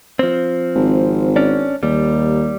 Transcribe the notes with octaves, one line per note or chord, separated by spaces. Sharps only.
F3 C4
G#1
C#4 D4
D#2 G3